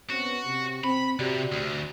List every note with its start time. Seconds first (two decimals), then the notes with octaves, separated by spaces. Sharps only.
0.10 C#3 B3 C4 F#4
0.46 C3
0.84 C4 B5
1.19 C3 F#4 G4 D5
1.52 D2